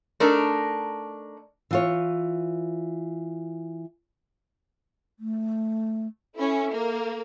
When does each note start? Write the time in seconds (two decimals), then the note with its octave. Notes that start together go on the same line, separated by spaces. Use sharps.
0.20 A3 D4 D#4 A#4
1.71 E3 F4 C#5
5.19 A3
6.35 C#4 E4 A4
6.72 A#3